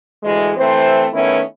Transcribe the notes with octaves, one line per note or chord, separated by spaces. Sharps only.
D2 E3 G#3
E3 A3 C4 C5
D#3 A3 B3 C#4 E4